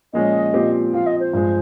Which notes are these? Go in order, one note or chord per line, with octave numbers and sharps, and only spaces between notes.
A#2 F3 G#3 C#4 D#5
A#2 F3 C4 G4 C5
F3 C4 F4 F5
D#5
C5
G2 F3 G#3